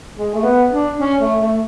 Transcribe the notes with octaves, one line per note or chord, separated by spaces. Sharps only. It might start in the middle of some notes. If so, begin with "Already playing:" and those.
G#3
A3
B3
D4
C#4
A3
A3